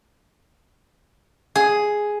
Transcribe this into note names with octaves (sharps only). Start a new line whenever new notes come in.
G#4